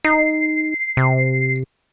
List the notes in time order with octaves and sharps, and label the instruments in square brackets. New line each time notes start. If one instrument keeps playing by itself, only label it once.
[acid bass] D#4 [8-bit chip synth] C7
[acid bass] C3